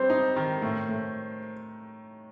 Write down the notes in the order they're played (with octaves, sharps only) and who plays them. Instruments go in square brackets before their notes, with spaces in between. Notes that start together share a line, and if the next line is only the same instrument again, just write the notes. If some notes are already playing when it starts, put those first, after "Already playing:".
Already playing: [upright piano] G3 C4 [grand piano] C5
[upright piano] D#4
D#3
A2
A2